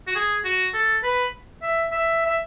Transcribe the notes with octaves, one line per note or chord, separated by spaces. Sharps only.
F#4
G#4
F#4
A4
B4
E5
E5
E5